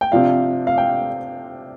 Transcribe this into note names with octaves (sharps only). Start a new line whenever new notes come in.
G5
C3 F3 D4 F5
F5
G5